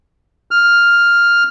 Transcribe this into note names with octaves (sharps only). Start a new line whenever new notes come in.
F6